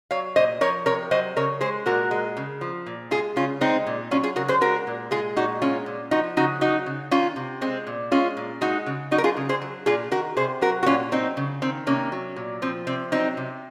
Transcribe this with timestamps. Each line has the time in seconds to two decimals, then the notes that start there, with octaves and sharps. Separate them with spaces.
0.11 F#3 C#5 F5
0.36 A#2 C5 D#5
0.61 F3 A#4 C#5
0.86 C3 A#4 C#5
1.11 F#3 C5 D#5
1.36 C#3 A#4 C#5
1.61 G#3 G#4 C5
1.86 A#2 F#4 A#4
2.11 G#3
2.37 C#3
2.61 F3
2.86 A#2
3.11 G#3 F4 G#4
3.36 C#3 C#4 F4
3.61 G#3 C4 D#4
3.87 A#2
4.11 F#3 C#4 F4
4.23 F4 G#4
4.36 C#3 F#4 A#4
4.48 G#4 C5
4.61 G#3 F#4 A#4
4.87 A#2
5.11 G#3 F4 G#4
5.36 A#2 D#4 F#4
5.62 G#3 C#4 F4
5.86 A#2
6.11 F3 D#4 F#4
6.37 C#3 D#4 F#4
6.61 F#3 D#4 F#4
6.86 C#3
7.11 D#3 C#4 F4
7.36 C3
7.61 G#3 C4
7.87 A#2
8.11 G#3 C#4 F4
8.37 A#2
8.61 G#3 D#4 F#4
8.86 C#3
9.11 F#3 D#4 F#4
9.18 A#4
9.24 F4 G#4
9.37 C#3
9.49 G#4 C5
9.62 F#3
9.86 A#2 F4 G#4
10.11 D#3 F#4 A#4
10.37 C3 G#4 C5
10.61 F#3 F#4 A#4
10.83 F#4
10.86 A#2 C#4 F4
11.12 F#3 C4 D#4
11.37 C#3
11.62 D#3 C4
11.87 C3 A#3 C#4
12.12 F#3
12.36 A#2
12.62 F3 C4
12.87 C3 C4
13.12 F#3 C4 D#4
13.37 C3